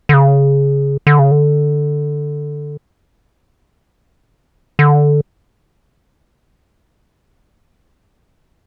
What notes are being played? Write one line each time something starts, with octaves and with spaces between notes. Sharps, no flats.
D3
C#3
D3
C#3
D3
D3